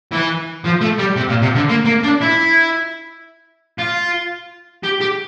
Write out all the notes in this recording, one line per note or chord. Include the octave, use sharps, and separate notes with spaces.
E3
F3
A3
G3
C3
A#2
C3
D3
A#3
A#3
D4
E4
F4
G4
G4